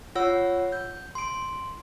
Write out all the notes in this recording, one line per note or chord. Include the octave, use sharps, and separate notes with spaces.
F4 C#5 F#5 E6
G6
C6 D7